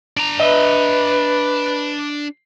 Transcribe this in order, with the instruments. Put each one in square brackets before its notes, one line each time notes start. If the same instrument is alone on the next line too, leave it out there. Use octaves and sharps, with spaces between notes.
[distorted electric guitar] D4 A#5
[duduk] B4 [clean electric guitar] D#5 E5